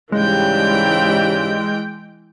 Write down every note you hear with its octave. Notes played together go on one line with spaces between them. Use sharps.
G#2 C#3 E3 G3 G#3 G5